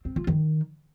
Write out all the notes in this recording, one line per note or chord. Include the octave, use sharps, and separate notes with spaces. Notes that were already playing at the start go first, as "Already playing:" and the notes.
C4
F4
D#3